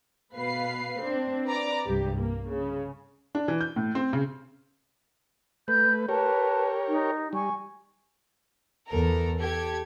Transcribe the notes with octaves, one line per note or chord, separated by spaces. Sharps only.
B2 B4 F5 C7
C4 D4
B4 D5 A#5 D6
C2 G2 G4
A#3
C#3
D4
E3
G6
A2
C4
C#3
A3 B4 G6
G4 A#4 B4 C#5 A5
D#4
G3 G#5 C#6
E2 A4 A#4
G4 A4 G#6